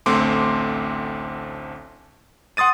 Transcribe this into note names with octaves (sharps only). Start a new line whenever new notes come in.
A1 D2 A3 C4 C6 D6
F#5 C6 D#6 A6 D#7